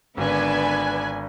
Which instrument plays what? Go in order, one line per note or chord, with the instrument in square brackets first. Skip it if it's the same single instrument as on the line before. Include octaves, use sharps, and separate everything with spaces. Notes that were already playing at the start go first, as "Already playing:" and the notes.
[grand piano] G#1 [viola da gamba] D3 B3 D4 [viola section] B4 G#5